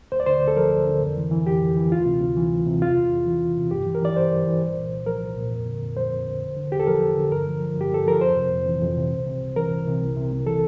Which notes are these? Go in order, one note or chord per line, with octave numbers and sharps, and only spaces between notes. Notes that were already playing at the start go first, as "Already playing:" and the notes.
D2 C5
D5
D3 C5
D2
A4
F3 A#4
D2
D3
F2
E3
E3
F2 G4
F2
E3
D2 F4
C3
D2
E3
D2
C3
E2 F4
C3
E2
E3
E2
C3
G2 G4
E3
A#4
E3 D5
G2 C5
G2
E3
C2
A#2
C2
F3 A#4
C2
A#2
F2
D3
F2
F3 C5
F2
D3
E2
D3
E2 G4
A4
F3 A#4
E2
D3
G2 A#4
F3
F3
G2 G4
G2 A4
F3 A#4
F2 C5
C3
F2
E3
F2
C3
C2
C3
C2
E3 A#4
C2
C3
C2
C3
C2
E3 A4